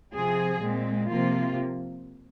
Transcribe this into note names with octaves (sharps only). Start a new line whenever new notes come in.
C3 F3 C4 G#4
A#2 G#3 C4
C3 F3 A#3 F4